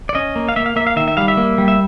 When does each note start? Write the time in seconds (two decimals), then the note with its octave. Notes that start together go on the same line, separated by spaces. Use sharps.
0.09 D5
0.15 C#4 D#5
0.36 A#3
0.49 F5
0.56 A#3 E5
0.66 F5
0.76 A#3 E5
0.87 F5
0.96 D#3 E5
1.08 E5
1.17 G3 F5
1.28 E5
1.37 A#3
1.58 G3
1.68 E5